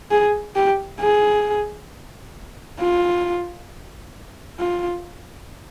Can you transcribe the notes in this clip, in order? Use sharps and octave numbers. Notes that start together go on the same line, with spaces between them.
G#4
G4
G#4
F4
F4